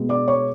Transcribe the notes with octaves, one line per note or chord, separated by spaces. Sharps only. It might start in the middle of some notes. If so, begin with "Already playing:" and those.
Already playing: B2 G#3 B3
D5 D6
C#5 C#6